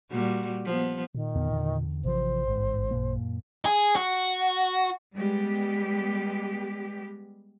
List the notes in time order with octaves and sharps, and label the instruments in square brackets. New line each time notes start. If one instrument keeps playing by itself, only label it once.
[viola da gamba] A#2 G3 F#4
F3 B3
[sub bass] A#2 [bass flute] D#3
[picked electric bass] E2 D3 B3
E2 D3
[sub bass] A1 [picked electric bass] C3 E3 F3 [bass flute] C5
[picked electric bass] G1 G#2
F#2 A#2 A#3
[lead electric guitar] G#4
F#4
[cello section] G3 G#3 B3 G4